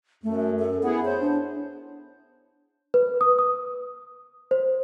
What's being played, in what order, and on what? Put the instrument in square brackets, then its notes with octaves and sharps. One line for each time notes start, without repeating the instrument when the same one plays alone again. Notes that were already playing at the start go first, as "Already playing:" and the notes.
[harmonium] F#2 [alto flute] A3
[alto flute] A4
[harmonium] B3 E4 G#4 [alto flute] F#5
[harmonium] C5 [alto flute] C#5
[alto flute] D4
[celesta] B4
D#6
D#6
C5